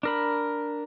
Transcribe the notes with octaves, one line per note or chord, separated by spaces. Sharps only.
D4 A#4 B5